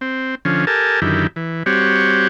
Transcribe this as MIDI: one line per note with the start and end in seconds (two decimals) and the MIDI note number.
0.01 0.35 60
0.45 0.65 50
0.45 0.65 53
0.45 0.65 61
0.67 1.00 67
0.67 1.00 69
0.67 1.00 70
0.67 1.00 80
0.67 1.00 81
1.02 1.27 42
1.02 1.27 50
1.02 1.27 51
1.02 1.27 64
1.02 1.27 67
1.36 1.63 52
1.66 2.28 55
1.66 2.28 60
1.66 2.28 66
1.66 2.28 67
1.66 2.28 73